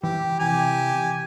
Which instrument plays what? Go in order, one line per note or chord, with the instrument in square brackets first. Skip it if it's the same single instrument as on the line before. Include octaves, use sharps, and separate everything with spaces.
[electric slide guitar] E3 [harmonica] G4
[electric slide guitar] C3 E3 A#5 [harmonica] G4 G#5